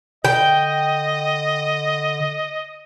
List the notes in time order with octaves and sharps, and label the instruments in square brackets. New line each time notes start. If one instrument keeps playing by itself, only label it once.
[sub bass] D3 [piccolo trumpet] D#5 [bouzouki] G5